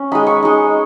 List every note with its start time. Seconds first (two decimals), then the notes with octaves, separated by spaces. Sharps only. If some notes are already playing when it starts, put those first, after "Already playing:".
Already playing: C#4
0.12 G#3 D#4 B5
0.27 C#6
0.43 G#3 D#4